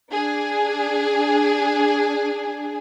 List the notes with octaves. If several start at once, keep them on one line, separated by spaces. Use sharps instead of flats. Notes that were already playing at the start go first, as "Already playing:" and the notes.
D4 G#4